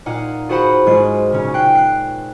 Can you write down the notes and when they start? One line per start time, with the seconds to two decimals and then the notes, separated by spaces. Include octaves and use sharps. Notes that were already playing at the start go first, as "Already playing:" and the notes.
0.06 A#2 D#4 F5 F#5
0.49 F4 F#4 G#4 C5 F#5 B5
0.86 G#2 G#3 F4 F#4 C7
1.30 A#2 C#3 C#4
1.54 G5 F#6 C7
1.75 F#6 C7